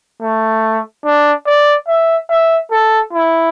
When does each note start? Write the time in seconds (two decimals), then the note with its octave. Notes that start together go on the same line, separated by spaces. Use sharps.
0.21 A3
1.05 D4
1.47 D5
1.88 E5
2.30 E5
2.71 A4
3.13 E4